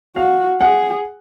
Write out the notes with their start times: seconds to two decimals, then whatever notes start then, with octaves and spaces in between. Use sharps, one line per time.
0.16 F#4 F5
0.61 G#4 F#5